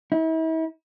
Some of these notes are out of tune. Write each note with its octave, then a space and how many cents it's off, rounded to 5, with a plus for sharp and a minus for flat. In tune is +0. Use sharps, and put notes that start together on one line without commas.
E4 -40